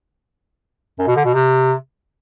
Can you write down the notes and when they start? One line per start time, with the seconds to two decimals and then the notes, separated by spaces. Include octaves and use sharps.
0.99 F#2
1.08 B2
1.16 D3
1.25 B2
1.34 C3